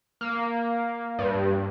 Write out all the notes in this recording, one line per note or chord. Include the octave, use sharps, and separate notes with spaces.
A#3
G2